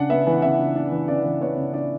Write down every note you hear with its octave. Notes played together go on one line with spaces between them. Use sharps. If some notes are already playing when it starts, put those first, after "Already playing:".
Already playing: C#3 D4 F#5
B3 E5
E3
C#3 E5
D4
D4
E3
C#3 D5
E3
B3 C#5
C#3
D4 D5